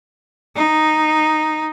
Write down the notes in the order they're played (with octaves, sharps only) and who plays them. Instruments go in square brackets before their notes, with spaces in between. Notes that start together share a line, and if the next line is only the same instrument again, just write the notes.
[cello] D#4